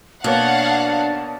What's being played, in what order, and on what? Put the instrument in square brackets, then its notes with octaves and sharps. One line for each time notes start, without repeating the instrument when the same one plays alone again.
[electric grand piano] B2 A#3 C#5 [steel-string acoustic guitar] D4 [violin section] F5 F#5 [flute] A5